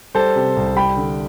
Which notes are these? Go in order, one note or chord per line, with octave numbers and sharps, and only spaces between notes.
G3 A4 C5
C3
C2
G3 G5 B5
D3